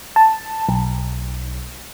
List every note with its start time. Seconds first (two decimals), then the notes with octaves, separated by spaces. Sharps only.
0.16 A5
0.69 B1